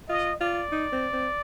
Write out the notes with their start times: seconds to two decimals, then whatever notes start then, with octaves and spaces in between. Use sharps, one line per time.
0.09 F4 D#5
0.40 F4 D5
0.72 D#4
0.92 C4
1.13 C4